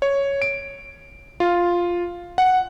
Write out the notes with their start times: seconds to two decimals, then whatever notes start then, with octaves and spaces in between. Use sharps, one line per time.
0.02 C#5
0.42 D7
1.40 F4
2.38 F#5